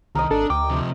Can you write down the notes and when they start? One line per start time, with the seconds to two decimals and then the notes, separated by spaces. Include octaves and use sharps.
0.15 C2 D#3 A#4 D#5
0.31 G#1 D4 A4
0.50 D2 G5 D6
0.70 C3 F3